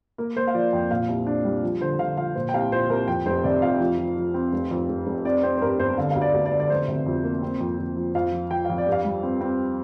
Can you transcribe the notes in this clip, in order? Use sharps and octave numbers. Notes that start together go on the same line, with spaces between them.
A#3 A#4
A#3 C5
F5
F3 D5
F2 G5
A#2 F5
C2
D4
G3
F3
D3 C5
D3 F5
F3 F5
A#2 C5
G5
C2 F5
A#2 C5
C2 A#4
F2 G5
F1 C5
C3 D5
F2 F5
F3
F3
F3
C4
F1
F2
F1
F1
C4 D5
C4 C5
C5
G2 A#4
G1 C5
D3 F5
D2 F5
D5
D2
D5
D3
D5
F1 C5
C3
F2
A#3
C4
F2
F2
F3
F2 F5
F3
F3 G5
F2 F5
D5
G2
F5
G3
C4
C4